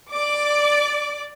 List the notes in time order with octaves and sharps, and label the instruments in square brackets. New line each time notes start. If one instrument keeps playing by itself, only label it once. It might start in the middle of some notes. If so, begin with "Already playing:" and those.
[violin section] D5 D6